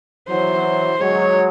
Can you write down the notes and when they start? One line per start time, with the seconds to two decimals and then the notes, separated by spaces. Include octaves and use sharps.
0.28 E3 F#3 C5
1.00 F#3 G#3 C#5